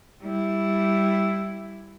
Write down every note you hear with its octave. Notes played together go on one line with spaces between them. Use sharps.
G3 E4